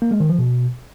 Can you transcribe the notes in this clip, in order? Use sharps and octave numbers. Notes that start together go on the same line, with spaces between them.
A#3
G#3
D#3
F3
B2